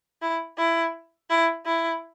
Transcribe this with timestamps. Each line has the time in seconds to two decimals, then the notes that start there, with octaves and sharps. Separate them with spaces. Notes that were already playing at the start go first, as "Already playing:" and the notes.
0.22 E4
0.58 E4
1.30 E4
1.66 E4